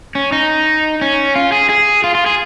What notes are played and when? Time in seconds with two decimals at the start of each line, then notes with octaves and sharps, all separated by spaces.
0.15 C#4
0.32 D#4
1.01 C#4
1.35 F4
1.52 G#4
1.69 G#4
2.04 F4
2.15 F4
2.26 G#4